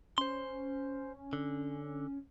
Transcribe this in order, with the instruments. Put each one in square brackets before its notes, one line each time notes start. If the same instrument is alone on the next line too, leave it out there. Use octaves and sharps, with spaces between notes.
[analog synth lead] C#4 [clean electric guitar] C5 C6
[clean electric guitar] D3